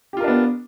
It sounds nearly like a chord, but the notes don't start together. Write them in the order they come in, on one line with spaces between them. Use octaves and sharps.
G4 F4 A#4 D4 B3